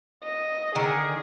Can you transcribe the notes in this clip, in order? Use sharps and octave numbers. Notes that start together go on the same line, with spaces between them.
D#5
D3 D#3 G#4